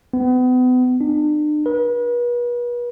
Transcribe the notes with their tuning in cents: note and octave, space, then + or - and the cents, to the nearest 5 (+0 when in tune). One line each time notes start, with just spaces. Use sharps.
B3 +35
D4 +45
B4 -40